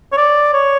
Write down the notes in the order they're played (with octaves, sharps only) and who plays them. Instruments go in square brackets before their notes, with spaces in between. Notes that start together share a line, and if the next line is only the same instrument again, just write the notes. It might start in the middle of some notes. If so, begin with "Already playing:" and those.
[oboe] C#5
D5
C#5